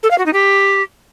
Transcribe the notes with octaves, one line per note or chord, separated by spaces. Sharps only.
A4
F5
F#4
D#4
G4